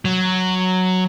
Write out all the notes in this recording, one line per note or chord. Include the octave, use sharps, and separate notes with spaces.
F#3